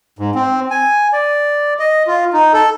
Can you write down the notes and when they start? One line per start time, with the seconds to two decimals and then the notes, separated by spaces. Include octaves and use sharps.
0.19 G#2
0.35 C4
0.70 G#5
1.12 D5
1.79 D#5
2.07 F4
2.33 D#4
2.53 A4